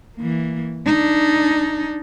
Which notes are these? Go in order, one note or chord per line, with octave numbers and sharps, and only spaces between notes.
E3 A#3
D4 D#4